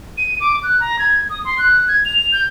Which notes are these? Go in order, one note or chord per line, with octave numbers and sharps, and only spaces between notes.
D#7
D6
F#6
A#5
G#6
D#6
C6
F#6
G#6
F7
F7
G6